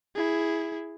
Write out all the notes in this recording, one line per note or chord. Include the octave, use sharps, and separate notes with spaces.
E4 G#4